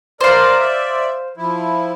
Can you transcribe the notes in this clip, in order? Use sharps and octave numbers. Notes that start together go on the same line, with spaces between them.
A#4 C5 D5 F5
D5 E5
F3 E4